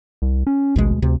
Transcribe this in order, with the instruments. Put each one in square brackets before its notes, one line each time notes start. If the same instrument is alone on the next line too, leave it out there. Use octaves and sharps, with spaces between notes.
[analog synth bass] C2
C#4
[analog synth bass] A1 [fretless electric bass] D2 B2 G#3
[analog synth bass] D2 [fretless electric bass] C3